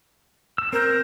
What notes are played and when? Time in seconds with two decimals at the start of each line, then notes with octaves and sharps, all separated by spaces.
0.58 E6
0.73 C4 A#4 G6